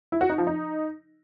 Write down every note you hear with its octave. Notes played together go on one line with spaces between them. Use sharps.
E4
F#4
D#4
F3
D#4